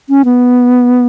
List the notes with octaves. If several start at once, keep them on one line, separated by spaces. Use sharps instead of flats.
C#4
B3